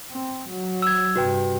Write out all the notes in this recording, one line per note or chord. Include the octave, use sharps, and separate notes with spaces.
C4
F#3
E6 G#6
G2 C3 F#4 B4 G5